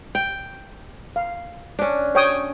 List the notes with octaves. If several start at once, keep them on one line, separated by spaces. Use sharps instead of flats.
G5
F5
C#4 D4
C#5 G5 D#6